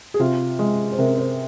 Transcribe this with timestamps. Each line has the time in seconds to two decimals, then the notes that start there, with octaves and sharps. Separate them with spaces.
0.14 G#4
0.20 C3 F4
0.59 G#3
0.92 C5
0.98 C3 A#4
1.18 C5